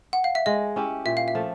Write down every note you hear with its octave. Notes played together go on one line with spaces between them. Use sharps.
F#5
F5
E5
G#3 D#5
C#4 E4 G4
A#2 E5
F5
E5
F3 A3